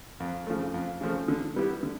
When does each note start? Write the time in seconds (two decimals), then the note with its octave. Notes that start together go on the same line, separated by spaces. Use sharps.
0.20 F2
0.47 C#3 F3 A3
0.74 F2
1.01 C#3 F3 A3
1.28 D3
1.56 G3 B3 E4 G4
1.83 D3